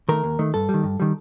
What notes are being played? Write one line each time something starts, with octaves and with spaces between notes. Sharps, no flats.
D#3 A3 A#4
D#2
D#3 A3
G2 A4
G3
D#3
G2
D#3 G3